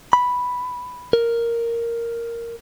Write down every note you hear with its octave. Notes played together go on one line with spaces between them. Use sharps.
B5
A#4